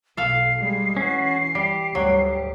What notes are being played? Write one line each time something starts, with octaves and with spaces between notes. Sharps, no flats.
B1 A4 F5 C7
G3 G#3
E3 C#4 F#4
G3 G4
D2 G#2 F#3 G3